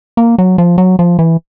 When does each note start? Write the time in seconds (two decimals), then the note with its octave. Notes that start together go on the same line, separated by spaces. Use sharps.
0.17 A#3
0.38 F#3
0.58 F3
0.78 F#3
0.99 F3
1.19 E3